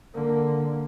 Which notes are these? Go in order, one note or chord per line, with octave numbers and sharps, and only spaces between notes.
D3 A#3